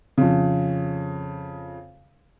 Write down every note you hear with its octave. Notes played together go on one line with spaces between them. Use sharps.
F2 C#3